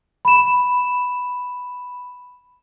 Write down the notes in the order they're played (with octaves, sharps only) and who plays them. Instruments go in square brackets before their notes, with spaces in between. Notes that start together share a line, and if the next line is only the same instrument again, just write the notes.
[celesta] B5 E7